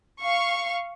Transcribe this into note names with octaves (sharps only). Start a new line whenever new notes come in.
F5 C#6